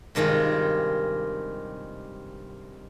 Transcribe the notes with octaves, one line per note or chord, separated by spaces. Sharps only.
G2 C3 D#3 G#3 F4